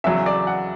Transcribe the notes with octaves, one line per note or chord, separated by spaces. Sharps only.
E2 C#3 F#3 E5
D5
F#5